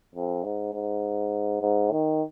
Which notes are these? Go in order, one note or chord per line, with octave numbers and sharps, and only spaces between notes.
F2
G#2
G#2
G#2
D#3